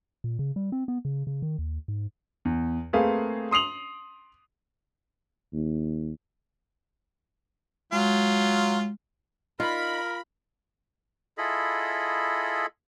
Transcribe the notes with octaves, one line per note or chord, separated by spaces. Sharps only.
A#2
C#3
G3
C4
B3
C#3
C#3
D#3
D#2
G#2
E2
A3 A#3 C4 G#4 B4 F5
C6 D#6 C7 F7 F#7
D#2
F#3 G#3 F4
D#4 F4 A#4 B5
E4 F4 G#4 A4 D#5 B5